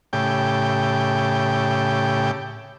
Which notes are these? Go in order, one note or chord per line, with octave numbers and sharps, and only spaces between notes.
A2 C#3 G4 G5